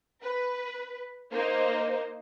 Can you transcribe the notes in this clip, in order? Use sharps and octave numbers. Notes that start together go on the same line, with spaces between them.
B4
A#3 D#4 C5